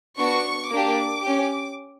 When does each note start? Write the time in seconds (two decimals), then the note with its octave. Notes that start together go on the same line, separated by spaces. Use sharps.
0.18 B3 D4 F#4 C#6
0.71 A#3 D4 G4 D6
1.23 C#4 G4